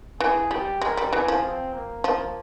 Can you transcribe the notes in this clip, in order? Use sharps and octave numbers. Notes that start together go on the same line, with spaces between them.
E3 G#4
G3 G4
G#3 A#4
G3
E3 G#4
F3
C4
A#3
F3 A#3